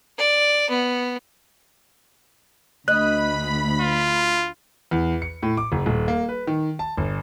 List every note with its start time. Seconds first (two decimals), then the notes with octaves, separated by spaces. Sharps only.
0.18 D5
0.70 B3
2.88 D2 D#5 B5 F#6
3.81 F4
4.91 E2
5.22 C#7
5.43 A2
5.57 D6
5.72 F#1
5.86 D#1
6.08 A#3
6.29 B4
6.47 D#3
6.79 A5
6.97 G1